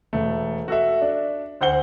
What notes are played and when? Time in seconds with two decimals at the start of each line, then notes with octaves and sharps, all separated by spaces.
0.13 E1 A3
0.68 F#4 A4 E5
1.02 D4
1.61 D2 C5 F#5 G7